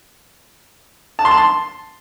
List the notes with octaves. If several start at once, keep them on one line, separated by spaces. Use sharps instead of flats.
A5
C6
A5
C6